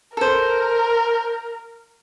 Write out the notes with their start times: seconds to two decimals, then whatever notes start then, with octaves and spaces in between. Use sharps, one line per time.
0.17 A4 A#4 C5